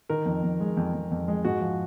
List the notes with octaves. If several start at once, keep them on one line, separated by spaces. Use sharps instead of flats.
D#3 A#4
F2
F2
G#3
F2
F2
F2
G#3
G#2 F#4
F3